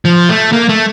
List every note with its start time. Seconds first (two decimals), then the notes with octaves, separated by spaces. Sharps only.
0.05 F3
0.29 A3
0.52 A#3
0.69 A3